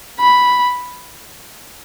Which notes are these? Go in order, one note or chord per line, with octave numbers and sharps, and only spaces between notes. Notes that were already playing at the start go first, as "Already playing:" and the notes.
B5